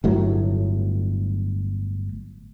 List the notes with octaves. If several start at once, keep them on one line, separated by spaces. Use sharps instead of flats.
G1 A2 F#3